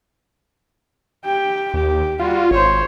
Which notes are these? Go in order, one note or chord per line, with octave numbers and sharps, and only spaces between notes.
G4 G5
D#2 G4
G3 F4 F#4
G#1 C5 C#5